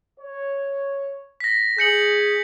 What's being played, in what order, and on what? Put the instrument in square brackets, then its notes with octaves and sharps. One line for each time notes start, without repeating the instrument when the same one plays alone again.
[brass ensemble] C#5
[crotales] A#6 B6
[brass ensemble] G#4 [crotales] G6 C#7 F#7